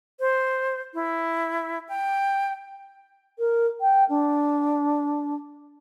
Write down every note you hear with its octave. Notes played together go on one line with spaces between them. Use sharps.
C5
E4
G5
A#4
G5
D4